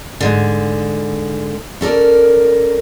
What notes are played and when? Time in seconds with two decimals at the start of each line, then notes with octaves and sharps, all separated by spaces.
0.21 G#2 D3
1.81 C#4 A4 A#4 D5